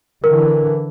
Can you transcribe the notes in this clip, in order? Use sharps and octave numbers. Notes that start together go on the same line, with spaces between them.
D3 E3 A#4